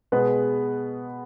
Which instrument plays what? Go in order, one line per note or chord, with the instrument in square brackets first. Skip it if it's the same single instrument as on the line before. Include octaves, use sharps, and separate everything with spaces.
[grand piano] B2 G#3 B3 G#4 B4